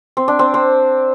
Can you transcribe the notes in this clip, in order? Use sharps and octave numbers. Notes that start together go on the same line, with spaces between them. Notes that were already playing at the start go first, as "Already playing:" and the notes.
C4
D4
C4
C4